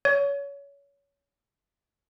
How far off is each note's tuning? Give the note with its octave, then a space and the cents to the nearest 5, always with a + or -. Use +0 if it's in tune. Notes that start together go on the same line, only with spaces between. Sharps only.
C#5 +25